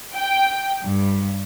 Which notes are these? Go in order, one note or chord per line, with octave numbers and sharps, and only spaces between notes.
G5
G2